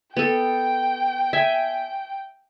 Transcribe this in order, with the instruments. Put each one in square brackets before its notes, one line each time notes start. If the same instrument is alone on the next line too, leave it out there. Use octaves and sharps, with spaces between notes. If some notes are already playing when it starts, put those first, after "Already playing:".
[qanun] B3 A4 [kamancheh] G5
[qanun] E5 G#5